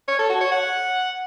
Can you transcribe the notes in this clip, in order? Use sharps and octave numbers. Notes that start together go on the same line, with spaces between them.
C#5
A4
F#4
C#5
F#5